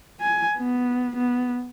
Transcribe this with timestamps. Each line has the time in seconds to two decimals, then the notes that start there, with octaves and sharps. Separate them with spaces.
0.21 G#5
0.58 B3
1.17 B3